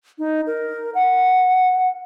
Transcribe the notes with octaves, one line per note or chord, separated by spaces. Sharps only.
D#4
A#4
F#5